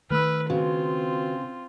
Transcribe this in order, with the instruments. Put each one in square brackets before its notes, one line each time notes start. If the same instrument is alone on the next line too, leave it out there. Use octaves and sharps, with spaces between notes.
[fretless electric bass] D#3 A3 [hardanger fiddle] B4 [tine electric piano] E6 F6
[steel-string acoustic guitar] C#3 [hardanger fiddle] C4 F4 [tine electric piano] F#4 B4